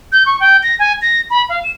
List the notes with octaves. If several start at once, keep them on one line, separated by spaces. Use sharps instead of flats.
G6
C#6
G5
A#6
G#5
A#6
B5
F5
E7